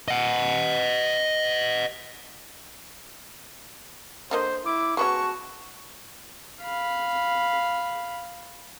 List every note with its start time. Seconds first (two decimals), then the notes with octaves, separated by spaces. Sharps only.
0.08 D#5 F#5
4.31 D3 A#3 C5 D#5
4.65 E4 D6
4.97 G#3 B3 C#4 F#4 A5 C#6
6.62 F5 B5